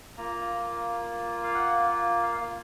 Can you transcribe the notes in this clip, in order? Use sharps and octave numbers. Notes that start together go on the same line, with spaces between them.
A#3 F4 A#5
F5
F#5
F5